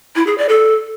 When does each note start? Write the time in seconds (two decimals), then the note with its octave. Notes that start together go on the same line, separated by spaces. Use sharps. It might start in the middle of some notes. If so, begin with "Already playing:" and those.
0.16 E4
0.27 G#4
0.38 D5
0.49 A4